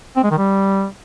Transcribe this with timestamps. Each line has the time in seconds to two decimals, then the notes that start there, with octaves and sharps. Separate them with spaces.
0.16 C4
0.24 G#3
0.31 D#3
0.38 G3